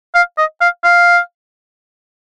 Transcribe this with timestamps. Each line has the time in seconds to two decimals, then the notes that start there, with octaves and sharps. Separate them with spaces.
0.15 F5
0.38 D#5
0.61 F5
0.84 F5